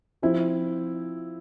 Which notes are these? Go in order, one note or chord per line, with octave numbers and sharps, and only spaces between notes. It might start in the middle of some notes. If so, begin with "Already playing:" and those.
F3 C4 E4